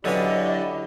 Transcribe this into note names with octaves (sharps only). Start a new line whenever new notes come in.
D3 F#3 C#4 E4 G4 B4 D5 D#5